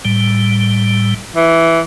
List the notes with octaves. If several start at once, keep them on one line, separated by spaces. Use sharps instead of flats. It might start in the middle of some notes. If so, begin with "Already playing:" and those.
A2 G3
E3